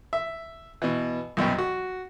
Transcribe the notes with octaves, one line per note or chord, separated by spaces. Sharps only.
E5
B2 E3
C2 F#2 B2 G5
F#4